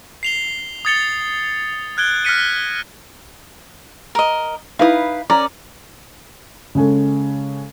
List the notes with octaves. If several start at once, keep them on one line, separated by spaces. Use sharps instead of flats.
C7 F7 G7
D#6 G#6 A6 C#7 F7 G7
F6 F#6 G#6 D7 G7
F6 F#6 A#6 B6 C#7 D#7
A#4 D#5
D#4 E4 B4 F5 D#6
C#4 A#4 D5 A#5
C#3 G#3 C#4 A4